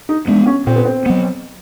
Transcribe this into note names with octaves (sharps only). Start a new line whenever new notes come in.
D#4
G#3 B3 D4
C#4
A#2 C4
B3
C4
F#3 B3